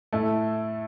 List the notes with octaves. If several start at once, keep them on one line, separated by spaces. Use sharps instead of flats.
A2 A3